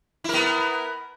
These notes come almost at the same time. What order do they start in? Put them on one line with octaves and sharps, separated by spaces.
E4 A#4 B3